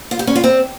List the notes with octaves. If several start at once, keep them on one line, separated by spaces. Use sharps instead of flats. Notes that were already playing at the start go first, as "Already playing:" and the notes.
F4
G4
C#4
F4
C4